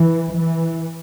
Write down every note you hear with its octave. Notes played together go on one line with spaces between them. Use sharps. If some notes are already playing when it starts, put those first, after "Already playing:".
Already playing: E3
E3